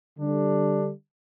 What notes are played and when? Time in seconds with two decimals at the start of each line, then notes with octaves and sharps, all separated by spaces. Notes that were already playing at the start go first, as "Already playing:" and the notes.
0.19 D3 G3 D4